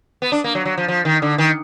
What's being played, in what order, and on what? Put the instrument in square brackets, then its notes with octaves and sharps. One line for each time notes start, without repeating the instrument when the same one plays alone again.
[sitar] B3
D4
A#3
F#3
F#3
F3
F3
D#3
D3
D#3